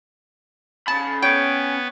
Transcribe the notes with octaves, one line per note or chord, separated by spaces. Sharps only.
C#4 A5 B5
B3 B4 C#5 G5